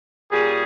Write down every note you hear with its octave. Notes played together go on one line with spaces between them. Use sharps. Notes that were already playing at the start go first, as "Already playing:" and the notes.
A#2 G3 C#4 G#4